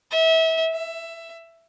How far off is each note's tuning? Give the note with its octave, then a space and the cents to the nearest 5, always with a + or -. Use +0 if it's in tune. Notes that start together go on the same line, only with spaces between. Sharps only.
E5 -30
E5 +15